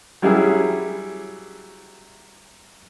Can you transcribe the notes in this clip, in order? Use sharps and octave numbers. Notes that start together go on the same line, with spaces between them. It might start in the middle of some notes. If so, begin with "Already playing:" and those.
F#3 G3 C#4 E4 G4 G#4